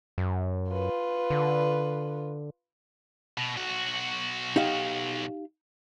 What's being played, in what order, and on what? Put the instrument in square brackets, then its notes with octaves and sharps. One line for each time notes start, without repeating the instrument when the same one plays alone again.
[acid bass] F#2
[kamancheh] F4 B4
[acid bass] D3
[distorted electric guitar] B2
B1 F#4
[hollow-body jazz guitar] D#4 G4 F5